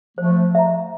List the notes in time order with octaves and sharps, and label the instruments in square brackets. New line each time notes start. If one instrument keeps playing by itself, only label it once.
[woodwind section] F3 A3 [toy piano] C5
[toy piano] E5 A#5